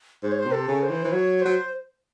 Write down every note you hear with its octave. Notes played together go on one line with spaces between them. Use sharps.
G#2 C5
C#5
C5
C3
A4
C#3
C5
E3
E3
F#3 C#5
F#3 C5